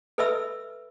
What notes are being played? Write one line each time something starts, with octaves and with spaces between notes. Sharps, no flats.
A4 B4 D#5 E5 B5 E6